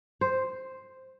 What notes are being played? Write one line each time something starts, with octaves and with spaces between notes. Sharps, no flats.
C5